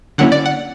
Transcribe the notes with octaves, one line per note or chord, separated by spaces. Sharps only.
D3 F#3 A#3 C#4 E4 F#5
D5
F#5